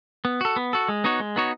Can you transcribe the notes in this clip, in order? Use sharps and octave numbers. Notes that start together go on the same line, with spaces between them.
B3
F#4 A4
B3
F#4 A4
G#3
B3 D#4 F#4 C#5
G#3
B3 D#4 F#4 C#5